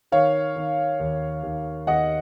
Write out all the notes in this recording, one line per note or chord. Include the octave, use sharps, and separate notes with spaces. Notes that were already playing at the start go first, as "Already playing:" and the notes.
D#3 C#5 F5
D#3
D#2
D#2
D#2 D#5 F#5